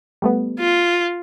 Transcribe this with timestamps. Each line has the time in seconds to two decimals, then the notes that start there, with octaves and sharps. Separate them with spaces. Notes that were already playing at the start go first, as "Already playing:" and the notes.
0.22 G3 A3 B3
0.59 F4